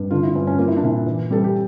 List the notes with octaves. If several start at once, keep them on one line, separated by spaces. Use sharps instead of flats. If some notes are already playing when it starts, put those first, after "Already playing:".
Already playing: G2
D3 F4
E4
G2 C#4
C#4
A#3 F4
E4
D4
A#2 E4
E3
G3 A4
G4